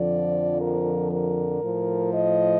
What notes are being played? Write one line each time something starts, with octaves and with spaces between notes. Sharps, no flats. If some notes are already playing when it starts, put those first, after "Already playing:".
Already playing: F2 D3 F3 D5
A#4
A#4
A2 F3
D#5